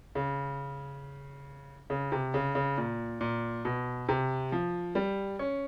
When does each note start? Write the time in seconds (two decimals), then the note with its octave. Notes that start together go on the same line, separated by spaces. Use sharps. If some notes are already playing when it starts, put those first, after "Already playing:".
0.15 C#3
1.90 C#3
2.12 C3
2.34 C#3
2.55 C#3
2.78 A#2
3.21 A#2
3.65 B2
4.09 C3
4.52 F3
4.95 G3
5.39 C#4